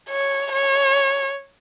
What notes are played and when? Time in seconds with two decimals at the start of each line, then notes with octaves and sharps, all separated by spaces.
0.10 C#5
0.52 C#5